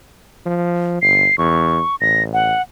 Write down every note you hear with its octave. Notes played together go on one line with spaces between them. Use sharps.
F3
G1 C7
E2 C#6
A1 A#6
F#5